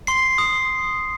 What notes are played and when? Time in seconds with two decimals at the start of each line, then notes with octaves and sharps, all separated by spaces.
0.07 C6 C7
0.38 D#6